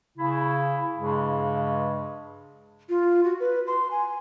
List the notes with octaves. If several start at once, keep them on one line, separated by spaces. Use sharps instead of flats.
C#3 E4
G2 C#3 G#3
F4
F#4
B4
C6
G#5